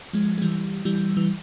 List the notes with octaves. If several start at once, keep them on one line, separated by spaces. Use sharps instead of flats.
F3 G#3
G#3
E3 G3
E3 G3
E3